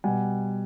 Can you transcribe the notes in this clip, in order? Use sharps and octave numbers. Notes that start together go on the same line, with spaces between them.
B2 G3 F#5 G#5